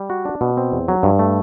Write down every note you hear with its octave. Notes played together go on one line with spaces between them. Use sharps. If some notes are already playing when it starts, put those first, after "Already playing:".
Already playing: G3
F#4
D4
B2
C4
E2
F#3
G2
A3